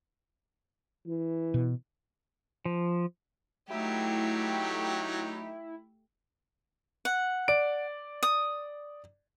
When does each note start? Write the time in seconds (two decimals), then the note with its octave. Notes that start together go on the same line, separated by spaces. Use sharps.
1.07 E3
1.54 B2
2.65 F3
3.70 F#3 A3 D#4 E4 G4
7.05 F#5
7.48 D5 D7
8.23 D#6